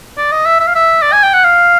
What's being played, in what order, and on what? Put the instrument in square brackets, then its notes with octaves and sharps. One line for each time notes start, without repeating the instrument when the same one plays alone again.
[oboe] D5
D#5
E5
E5
F5
E5
D5
G#5
G5
F#5
F5